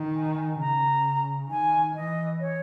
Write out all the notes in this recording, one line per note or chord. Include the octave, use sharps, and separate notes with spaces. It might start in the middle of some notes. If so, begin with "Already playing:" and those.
Already playing: D#3
G#5
C#3 A#5
D#3 G#5
E3 D#5
C#5